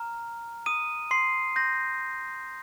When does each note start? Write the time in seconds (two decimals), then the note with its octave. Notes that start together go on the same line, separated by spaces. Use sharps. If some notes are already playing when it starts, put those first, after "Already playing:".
Already playing: A#5 F6
0.66 D#6 D#7
1.11 C6 C7
1.56 C6 G6 A#6